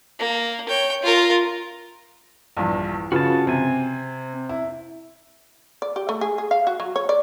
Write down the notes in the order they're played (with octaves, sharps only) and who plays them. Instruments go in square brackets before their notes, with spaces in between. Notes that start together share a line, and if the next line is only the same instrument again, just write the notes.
[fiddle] A#3
C#5 G5
F4 A#4
[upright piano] A#1 E2 G2
[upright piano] C#3 F4 B4 [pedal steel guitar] F#4 A5
[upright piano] C3 [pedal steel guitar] C4 G#5
[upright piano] E4
[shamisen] D5
G4
A3
G#4
G#4
F5
F#4
F#3
C#5
D5